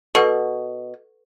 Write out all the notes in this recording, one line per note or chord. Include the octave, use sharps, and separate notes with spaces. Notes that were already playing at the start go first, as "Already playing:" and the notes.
B2 A4 B4 F#5